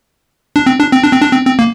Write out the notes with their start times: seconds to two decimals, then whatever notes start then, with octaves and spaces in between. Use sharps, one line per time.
0.56 D4
0.66 C4
0.80 D4
0.93 C4
1.03 D4
1.12 C4
1.22 D4
1.32 C4
1.45 C4
1.59 A#3